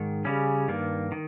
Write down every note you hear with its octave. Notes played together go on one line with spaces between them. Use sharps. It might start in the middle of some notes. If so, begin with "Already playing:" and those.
Already playing: G#2 D#3
C#3 G3 C#4
G2 D#3 A#3
D#3